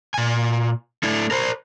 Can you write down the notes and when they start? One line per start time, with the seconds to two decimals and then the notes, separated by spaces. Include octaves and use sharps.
0.14 A#2 G#5
1.03 A3 D4 E4
1.31 A#4 C5